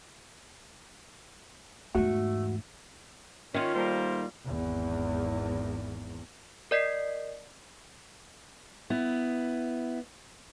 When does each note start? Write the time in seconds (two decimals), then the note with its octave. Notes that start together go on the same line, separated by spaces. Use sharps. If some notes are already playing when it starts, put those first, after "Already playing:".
1.95 E2 G#2 A3 F#4
3.54 D#3 C#4 F4
3.75 G3 A3 A#3 A#4 C5
4.45 G#1 E2
6.71 A#4 D5 D#5 B6 C7
8.90 B3 E4